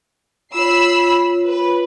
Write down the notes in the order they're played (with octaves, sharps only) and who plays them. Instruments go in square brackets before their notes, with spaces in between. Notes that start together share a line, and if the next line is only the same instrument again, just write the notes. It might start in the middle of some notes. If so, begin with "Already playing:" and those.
[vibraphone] F4 C#5 [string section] B5 E6 C7
[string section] B4